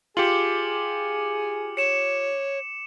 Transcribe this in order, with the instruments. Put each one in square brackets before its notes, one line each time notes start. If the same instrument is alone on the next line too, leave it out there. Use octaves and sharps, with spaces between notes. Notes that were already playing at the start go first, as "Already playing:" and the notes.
[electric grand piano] F4 G4 [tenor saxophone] G#4 [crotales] D6 C#7 F#7
[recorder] C#5 [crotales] C#7 E7